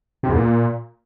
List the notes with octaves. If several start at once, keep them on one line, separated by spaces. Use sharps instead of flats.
C3
E2
A#2